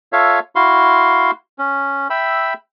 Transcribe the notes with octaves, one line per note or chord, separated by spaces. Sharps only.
F4 A4 C#5 E5 F5
E4 F#4 F5 C6
C#4
E5 G5 B5 E6